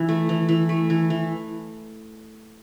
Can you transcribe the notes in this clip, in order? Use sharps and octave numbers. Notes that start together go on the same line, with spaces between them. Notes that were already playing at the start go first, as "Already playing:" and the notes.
Already playing: E3
A3
E3
E3
A3
E3
E3